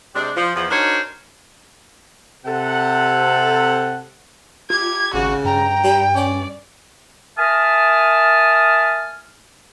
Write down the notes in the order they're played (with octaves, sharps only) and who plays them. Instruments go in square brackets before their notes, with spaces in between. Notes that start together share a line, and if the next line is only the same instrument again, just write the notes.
[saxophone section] C3 G3 G#3 D4
F3
E2 F3
D4 D#4 F#4 A#4 C5 C#5
[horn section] C3 A4 F#5
[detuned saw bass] F4 [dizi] G4 [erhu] G#6
[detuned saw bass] G#1 [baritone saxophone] C#3 [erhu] F#4
[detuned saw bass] G2 [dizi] G5 [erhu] A#5
[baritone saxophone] G3
[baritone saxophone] C#4 [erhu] D5
[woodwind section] A#4 E5 G#5 A5 D#6 F6